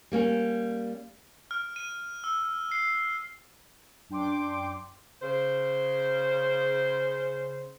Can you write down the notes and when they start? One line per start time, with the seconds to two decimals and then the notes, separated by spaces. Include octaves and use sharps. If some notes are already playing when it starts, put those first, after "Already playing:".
0.12 G3 A#3 C#4
1.51 F6
1.76 D#7
2.24 E6
2.72 C7
4.09 F#2 D4 G5 C6 D6
5.22 C#3 C5